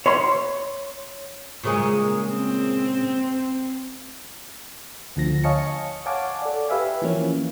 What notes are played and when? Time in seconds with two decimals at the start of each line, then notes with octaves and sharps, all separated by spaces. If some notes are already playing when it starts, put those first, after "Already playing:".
0.06 C#5 B5 C6
1.63 A#2 C#3 G#3
2.27 C4
5.16 D2 D3 F3 A#6
5.44 C#5 D#5 F5 G#5 A5 C#7
6.06 C#5 F5 F#5 G#5 A5 D6
6.42 A4 D5
6.69 G4 B4 E5 F5 G#5
7.02 E3 F3 A#3 C#4